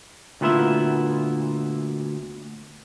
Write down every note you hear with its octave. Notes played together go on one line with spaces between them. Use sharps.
D2 A#2 B3 E4 F4 E5